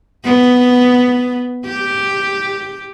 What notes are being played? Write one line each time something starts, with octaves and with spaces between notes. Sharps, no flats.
B3
G4